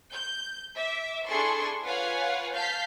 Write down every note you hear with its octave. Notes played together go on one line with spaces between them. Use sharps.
G6
E5 D6
D4 E4 G#4 A4 C6 C#6
F4 B4 C#5 F5 F#5 G#5
F5 A5 F6 G6 B6 C7